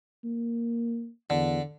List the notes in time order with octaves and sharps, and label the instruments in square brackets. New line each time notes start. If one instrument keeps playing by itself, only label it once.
[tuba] A#3
[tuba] E2 [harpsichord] D3